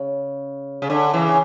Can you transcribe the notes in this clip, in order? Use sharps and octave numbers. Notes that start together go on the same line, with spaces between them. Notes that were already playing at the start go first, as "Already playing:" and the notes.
Already playing: C#3
C#3
D3
C#3 E3